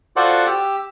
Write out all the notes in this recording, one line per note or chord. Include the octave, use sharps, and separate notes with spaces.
F4 F#4 A4 C5 D5 F#5
G4 E6